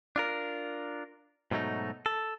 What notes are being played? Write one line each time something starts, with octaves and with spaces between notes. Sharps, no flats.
D4 F4 A#4
G#2 B2 F#3 A3 D#4
A4